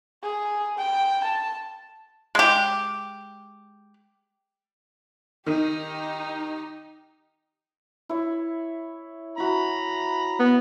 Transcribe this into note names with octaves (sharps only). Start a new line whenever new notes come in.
G#4
G5
A5
G#3 G4
D#3 D#4 G4
E4 C#5
E4 F#4 A#5 B5
B3